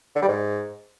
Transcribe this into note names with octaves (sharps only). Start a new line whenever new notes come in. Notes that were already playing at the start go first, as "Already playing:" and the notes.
D3
G3
G#2